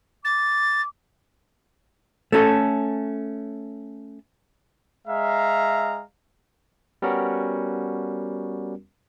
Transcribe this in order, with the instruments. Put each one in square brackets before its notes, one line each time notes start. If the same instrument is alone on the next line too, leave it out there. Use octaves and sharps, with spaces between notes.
[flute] D6 [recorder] A6
[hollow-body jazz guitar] A3 C#4 A4
[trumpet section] G#3 E5 F5 A#5
[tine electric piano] G3 B3 C#4 F#4 A#4